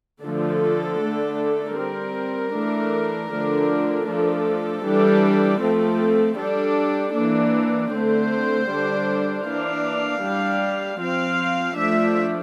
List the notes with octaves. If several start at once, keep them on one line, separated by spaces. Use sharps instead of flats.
D3 F3 A3 A4
D3 A3 D4
G3 C4 A#4
E3 A3 D4
D3 F3 A3 D4
F3 A3 D4 A4
E3 G3 D4
F3 A3 C4
G3 D4 A4
E3 A#3 D4
D3 A3 C4 C5
D3 G3 D4
E3 A#3 D4 F5
G3 D4
F3 C4 F5
F3 A3 D4 E5